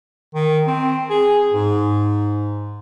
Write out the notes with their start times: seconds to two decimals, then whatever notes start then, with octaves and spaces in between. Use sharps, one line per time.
0.34 D#3
0.67 C4
1.10 G#4
1.52 G#2